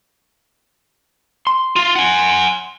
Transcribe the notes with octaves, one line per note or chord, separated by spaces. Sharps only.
C6
F4
F#5 G#5